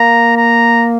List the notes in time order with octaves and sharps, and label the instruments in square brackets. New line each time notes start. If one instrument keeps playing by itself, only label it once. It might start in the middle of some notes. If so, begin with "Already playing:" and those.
Already playing: [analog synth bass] A#3 [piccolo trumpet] A#5
[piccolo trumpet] A#5